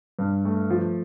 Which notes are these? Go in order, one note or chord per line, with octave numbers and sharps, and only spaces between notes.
G2
A3
F3